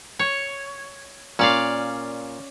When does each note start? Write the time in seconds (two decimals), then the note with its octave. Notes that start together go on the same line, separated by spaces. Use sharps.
0.19 C#5
1.39 A#2 C#4 D5 F5